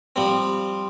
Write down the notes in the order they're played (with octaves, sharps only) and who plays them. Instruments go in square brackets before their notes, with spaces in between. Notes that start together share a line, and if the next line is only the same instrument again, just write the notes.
[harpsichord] F3 G3 C4